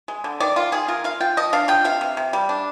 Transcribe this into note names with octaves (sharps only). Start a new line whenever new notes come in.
G#3
D3
D#3 D5
D#3 F4
D#3 G#4
F4 A#4
F4 F5
F4 G5
F3 D#5
D4 F5
F4 G5
C3 F5
C3
C3
G3
D4